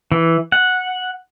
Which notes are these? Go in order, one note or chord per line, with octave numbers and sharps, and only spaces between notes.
E3
F#5